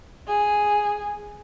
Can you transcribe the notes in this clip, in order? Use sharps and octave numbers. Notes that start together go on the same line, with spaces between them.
G#4